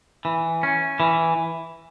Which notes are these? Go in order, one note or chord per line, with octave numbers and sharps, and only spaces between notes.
E3
C#4
E3